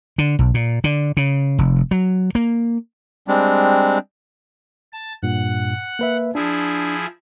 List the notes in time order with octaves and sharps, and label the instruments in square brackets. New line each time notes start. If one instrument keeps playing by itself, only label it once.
[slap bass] D3
B1
A#2
D3
C#3
F1
F#3
A#3
[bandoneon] G3 G#3 C4 D4
[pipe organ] A5
[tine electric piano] G2 A#2 [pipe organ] F#5 F#6
[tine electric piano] A#3 B4 E5
[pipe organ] F3 E4 G#4 [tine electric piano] D4